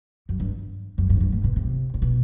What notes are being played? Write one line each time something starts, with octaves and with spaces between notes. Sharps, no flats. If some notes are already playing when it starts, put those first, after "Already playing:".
F#2
G2
F#2
G2
F#2
G2
A2
B2
C3
A2
B2